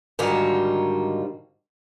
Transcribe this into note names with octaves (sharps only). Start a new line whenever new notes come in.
G#2 D3 D#3 G3 F4 F#4